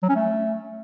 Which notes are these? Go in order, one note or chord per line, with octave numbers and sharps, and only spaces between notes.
F#3
C#4
A3